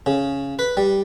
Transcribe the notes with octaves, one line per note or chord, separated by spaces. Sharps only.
C#3
B4
G3